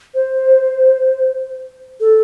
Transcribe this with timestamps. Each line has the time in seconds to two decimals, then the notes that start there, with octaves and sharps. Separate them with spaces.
0.14 C5
2.00 A4